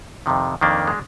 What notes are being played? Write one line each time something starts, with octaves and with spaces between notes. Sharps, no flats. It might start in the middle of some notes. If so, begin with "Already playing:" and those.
F2 C3 D#3
F2 D#3 A#3 D4
G#3